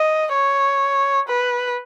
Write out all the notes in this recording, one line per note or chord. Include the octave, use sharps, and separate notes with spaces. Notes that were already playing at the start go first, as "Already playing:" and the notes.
Already playing: D#5
C#5
B4